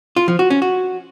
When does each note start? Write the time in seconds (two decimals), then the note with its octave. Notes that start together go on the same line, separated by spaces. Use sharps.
0.16 F4
0.28 F3
0.39 F#4
0.50 C#4
0.62 F#4